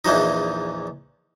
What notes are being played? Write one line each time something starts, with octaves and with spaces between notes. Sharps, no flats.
A#1 E2 E3 F3 D#4